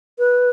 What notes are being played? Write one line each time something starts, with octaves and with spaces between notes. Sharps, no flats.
B4